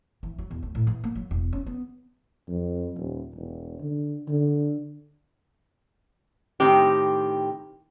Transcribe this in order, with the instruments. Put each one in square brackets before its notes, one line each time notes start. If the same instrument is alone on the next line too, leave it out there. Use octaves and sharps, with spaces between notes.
[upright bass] E3
F#3
E2
D2
A2
E3
A#3
F#3
E1
C#4
B3
[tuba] F2
D#1
E1
D3
D3
[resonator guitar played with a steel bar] A2 D#3 C4 G4